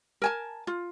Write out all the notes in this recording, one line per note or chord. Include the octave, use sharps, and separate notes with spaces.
A#4 G#5 A5
F4